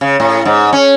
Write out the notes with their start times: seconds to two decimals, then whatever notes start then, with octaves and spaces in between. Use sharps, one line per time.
0.01 C#3
0.20 A2
0.45 G#2
0.73 C#4